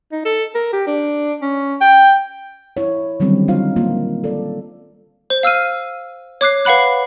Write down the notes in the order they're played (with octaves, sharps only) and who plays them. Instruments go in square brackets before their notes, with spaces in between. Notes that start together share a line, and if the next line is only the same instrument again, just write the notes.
[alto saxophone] D#4
A4
A#4
G4
D4
C#4
G5
[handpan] E4 C#5
D3 D#3 F#3 G3 C4 C#4
D#4 F4 C5 F5
A#3 F4
A4 D5
[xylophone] C5
F5 E6 F6 D#7
C#5 D6 F#6 C7
B4 F5 F#5 B5 F#6